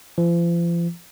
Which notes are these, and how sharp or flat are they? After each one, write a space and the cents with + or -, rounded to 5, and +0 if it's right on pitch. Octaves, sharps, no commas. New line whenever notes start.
F3 -40